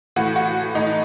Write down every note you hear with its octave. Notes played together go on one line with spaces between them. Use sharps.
A2 E3 F#4
F#4
A2 E3 D#4